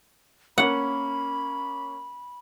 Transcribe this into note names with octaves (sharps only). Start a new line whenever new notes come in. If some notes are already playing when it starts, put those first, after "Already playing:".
A#3 C#4 F#5 B5